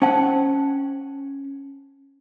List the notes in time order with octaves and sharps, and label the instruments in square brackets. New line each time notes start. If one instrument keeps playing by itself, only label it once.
[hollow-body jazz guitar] C#4 F#5 [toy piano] C5 G5 A5